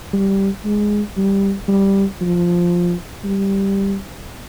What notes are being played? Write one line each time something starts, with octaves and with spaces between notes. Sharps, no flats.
G3
G#3
G3
G3
F3
G3